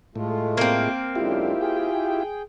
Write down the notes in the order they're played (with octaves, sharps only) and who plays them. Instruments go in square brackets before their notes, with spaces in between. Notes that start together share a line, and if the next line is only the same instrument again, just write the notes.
[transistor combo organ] A2 [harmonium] G#3 A3 F4
[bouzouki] A#3 C4
[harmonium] F#2 D3 G#3 [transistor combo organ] E4 F4 G4
[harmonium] G#4 G5